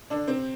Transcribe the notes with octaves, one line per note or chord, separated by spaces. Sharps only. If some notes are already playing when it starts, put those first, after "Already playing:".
D3 D4
C3 C4